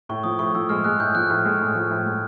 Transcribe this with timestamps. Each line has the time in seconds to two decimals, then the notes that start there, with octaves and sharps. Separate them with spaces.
0.09 A2 C#6
0.24 F3 D#6
0.39 A2 C#6
0.54 F3 E6
0.69 G#3 F6
0.84 G#3 F#6
1.00 A2 G6
1.15 F3 F#6
1.30 A2 F6
1.45 G#3
1.60 A2
1.75 F3
1.91 A2
2.06 G#3